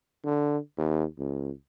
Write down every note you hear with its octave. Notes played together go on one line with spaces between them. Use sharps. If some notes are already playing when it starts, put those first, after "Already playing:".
D3
D#2
C#2